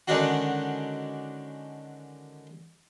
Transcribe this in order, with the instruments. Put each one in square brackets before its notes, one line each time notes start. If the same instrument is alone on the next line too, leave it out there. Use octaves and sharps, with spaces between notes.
[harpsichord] D3 D#3 G#3 C#4 D4 F#4